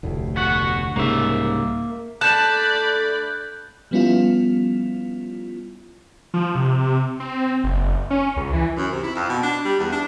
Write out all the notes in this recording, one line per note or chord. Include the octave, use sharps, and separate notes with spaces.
F1 D2 A2
B3 F#4 F#5
C2 G#2 C#3 A#3 E5
A3 D4 A4 D5 A5 B5 F#6 G6
F3 G3 B3 C#4 E4 F4
F3
C3
C4
F#1
C#4
C#2
E3
F#2
C3
E4
F2
B2
D4
G3
E2
D4